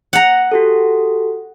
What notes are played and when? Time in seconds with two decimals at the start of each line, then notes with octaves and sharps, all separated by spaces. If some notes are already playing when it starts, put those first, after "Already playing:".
0.13 F#5 A#5
0.52 F#4 G4 A4